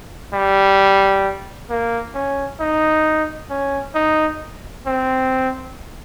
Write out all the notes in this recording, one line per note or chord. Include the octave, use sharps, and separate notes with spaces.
G3
A#3
C#4
D#4
C#4
D#4
C4